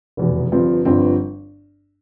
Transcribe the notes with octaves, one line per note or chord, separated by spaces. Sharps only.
F1 E2 B2
G1 G2 F3 C4
G1 G2 F3 C4